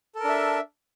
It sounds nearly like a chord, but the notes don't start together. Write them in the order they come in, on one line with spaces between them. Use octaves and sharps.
A4 A#4 D4 E5